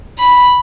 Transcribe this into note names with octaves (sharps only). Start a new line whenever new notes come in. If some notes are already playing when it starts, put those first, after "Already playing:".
B5